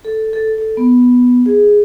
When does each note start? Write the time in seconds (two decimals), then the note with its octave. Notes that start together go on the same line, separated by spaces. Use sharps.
0.05 A4
0.33 A4
0.58 A4
0.77 B3
1.46 G#4